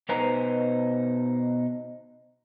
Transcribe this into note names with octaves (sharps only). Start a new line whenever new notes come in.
B2 D#4 B4 C5 G#5 A#5